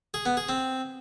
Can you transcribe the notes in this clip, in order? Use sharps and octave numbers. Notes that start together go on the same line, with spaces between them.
G#4
B3
G#4
C4